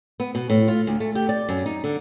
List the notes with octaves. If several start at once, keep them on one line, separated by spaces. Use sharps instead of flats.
B3
B2
A2
F4
D2
A3
G4
D5
F#2
D#4
D3